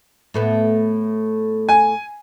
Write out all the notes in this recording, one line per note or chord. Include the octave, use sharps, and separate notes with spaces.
A2 A3 B3
G#5